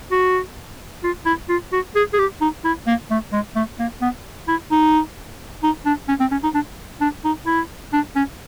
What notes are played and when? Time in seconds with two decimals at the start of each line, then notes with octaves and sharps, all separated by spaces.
0.11 F#4
1.04 F4
1.26 E4
1.49 F4
1.73 F#4
1.95 G#4
2.13 G#4
2.19 G4
2.41 D#4
2.65 E4
2.87 A#3
3.11 A3
3.33 G#3
3.56 A3
3.79 A#3
4.02 B3
4.48 E4
4.71 D#4
5.63 D#4
5.86 D4
6.08 C#4
6.20 C4
6.32 C#4
6.43 D#4
6.54 D4
7.01 D4
7.25 D#4
7.46 E4
7.93 D4
8.16 C#4